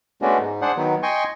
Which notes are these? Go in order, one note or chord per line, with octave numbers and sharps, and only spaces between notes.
G#3 A3 B3 C#4 D4 F#4
G#2
D4 G#4 C5 F#5
D#3 F#3 B3
D#5 G5 G#5 C6 C#6